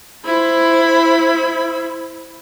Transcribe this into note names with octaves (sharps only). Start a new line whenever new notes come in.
E4 C5 B5